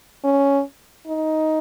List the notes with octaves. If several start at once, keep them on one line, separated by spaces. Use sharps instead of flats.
C#4
D#4